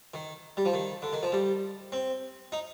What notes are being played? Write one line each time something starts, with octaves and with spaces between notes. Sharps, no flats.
D#3
G3
F3
D#3
D3
D#3
F3
G3
C4
D#4